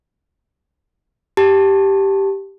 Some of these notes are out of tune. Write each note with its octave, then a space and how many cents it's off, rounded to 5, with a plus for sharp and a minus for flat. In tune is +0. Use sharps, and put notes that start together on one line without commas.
G4 +0 A5 +0